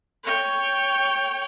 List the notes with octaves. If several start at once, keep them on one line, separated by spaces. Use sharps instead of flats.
C#5 G5